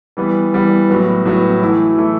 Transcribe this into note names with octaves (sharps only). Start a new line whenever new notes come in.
E3 G3 B3
E3 G3 B3
A2 F#3 B3
A2 F#3 B3
E3 A3 E4
E3 A3 E4